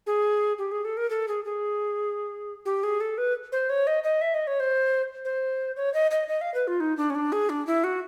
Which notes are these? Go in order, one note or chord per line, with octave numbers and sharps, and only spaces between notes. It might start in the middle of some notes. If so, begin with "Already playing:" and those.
G#4
G4
G#4
A4
A#4
A4
G#4
G#4
G4
G#4
A4
B4
C5
C#5
D#5
D#5
E5
D#5
C#5
C5
C5
C#5
D#5
D#5
D#5
F5
B4
F4
D#4
D4
C#4
D4
G#4
D4
E4
F#4